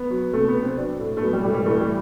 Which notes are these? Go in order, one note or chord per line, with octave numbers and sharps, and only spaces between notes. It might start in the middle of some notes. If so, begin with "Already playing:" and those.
Already playing: B3
F#3
C3 A3
B3
C3
C4
F#3 D4
A2
A3
F#3 B3
G3
A2 G3
G3
E3 A3
G3